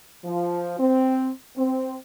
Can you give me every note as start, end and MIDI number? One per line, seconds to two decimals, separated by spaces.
0.24 0.77 53
0.79 1.30 60
1.57 1.95 60